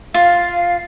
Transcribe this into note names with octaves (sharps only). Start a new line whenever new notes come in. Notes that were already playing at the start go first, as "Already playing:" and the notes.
F4 F5